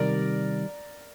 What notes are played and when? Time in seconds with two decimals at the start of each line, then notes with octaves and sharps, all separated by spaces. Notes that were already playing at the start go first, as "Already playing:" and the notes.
Already playing: C3 D#3 G3 A#4 D5